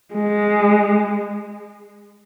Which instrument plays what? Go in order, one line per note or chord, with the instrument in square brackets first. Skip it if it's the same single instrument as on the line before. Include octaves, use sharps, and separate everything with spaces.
[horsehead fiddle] G#3